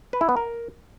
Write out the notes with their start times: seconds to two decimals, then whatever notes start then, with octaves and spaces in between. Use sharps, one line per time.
0.13 B4
0.21 E4
0.29 B3
0.37 A#4